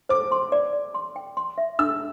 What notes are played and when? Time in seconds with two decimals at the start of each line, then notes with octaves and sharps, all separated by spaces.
0.09 C5 D6
0.32 C6
0.52 D5
0.73 D5
0.94 C6
1.16 G5
1.37 C6
1.58 E5
1.79 D4 E6